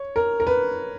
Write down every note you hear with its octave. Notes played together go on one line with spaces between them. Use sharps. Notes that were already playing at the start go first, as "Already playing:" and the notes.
Already playing: C#5
A#4
A#4
B4